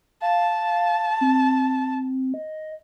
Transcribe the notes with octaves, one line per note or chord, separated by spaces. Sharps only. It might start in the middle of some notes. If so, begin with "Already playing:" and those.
F5 A5
C4
D#5